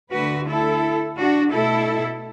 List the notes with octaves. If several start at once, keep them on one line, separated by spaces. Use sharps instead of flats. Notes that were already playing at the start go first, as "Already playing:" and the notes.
D2 D3 A3 F#4 B4
E4 A4
D4 F#4
B2 A3 E4 A4